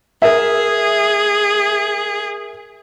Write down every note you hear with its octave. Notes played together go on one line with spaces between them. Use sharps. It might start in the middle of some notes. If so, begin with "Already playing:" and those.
G#4 A#4 E5